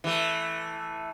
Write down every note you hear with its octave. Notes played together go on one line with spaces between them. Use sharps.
E3 A3